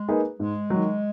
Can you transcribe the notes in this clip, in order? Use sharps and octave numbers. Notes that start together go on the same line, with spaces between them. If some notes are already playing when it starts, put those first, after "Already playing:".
Already playing: G#3
A#3 D#4 G#4 B4
G#2 G#3
F#3
D#3